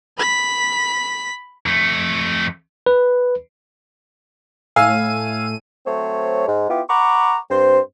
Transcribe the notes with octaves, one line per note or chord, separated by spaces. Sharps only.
B5 B6
F2 A3
B4
A2 F5 G#5 E6 D#7
F#3 A3 C4 C5 C#5
G#2
B3 E4 F4 G4
F#5 A#5 B5 C#6 D6
G2 C4 C5